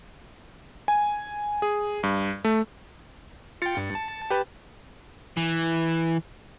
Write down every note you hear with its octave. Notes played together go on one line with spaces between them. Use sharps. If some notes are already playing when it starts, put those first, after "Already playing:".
G#5
G#4
G2
A3
F4 G5 A6 C#7
G2
A5
G4 B4
E3